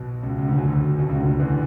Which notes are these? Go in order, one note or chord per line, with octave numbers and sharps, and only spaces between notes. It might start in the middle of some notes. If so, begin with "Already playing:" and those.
Already playing: B1 B2
C#2 C#3
C#2 C#3
D2 D3
F#2 F#3
D2 D3
B1 B2
C#2 C#3
D2 D3
D2 D3
E2 E3
D3